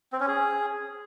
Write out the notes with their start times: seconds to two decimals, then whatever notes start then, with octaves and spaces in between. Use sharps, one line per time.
0.12 C4
0.20 C#4
0.28 G#4